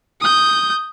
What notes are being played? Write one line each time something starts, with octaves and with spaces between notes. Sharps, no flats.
D#6 G6